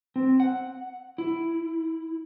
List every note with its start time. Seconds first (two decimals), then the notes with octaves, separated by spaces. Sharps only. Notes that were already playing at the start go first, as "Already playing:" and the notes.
0.16 C4
0.40 F#5
1.18 E4